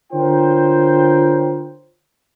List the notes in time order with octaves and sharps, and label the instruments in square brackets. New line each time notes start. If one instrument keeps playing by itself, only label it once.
[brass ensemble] D3 F4 A#4 C5 C#5 G5